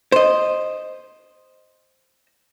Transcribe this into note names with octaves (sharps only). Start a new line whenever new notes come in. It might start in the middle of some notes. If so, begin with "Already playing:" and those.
C5 D#5